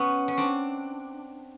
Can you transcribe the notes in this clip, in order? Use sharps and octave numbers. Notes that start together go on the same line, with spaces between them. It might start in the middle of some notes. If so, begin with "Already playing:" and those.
Already playing: B3 C#4
C#4
C4 D4